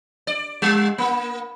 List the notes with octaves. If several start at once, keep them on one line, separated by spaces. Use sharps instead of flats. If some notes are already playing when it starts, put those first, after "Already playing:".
D5
G3
A#3